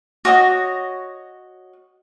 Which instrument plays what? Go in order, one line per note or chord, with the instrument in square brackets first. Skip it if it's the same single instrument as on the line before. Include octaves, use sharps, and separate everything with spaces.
[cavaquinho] F#4 C#5 D#5